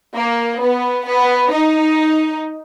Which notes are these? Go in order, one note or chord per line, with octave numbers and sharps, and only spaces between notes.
A#3
B3
B3
D#4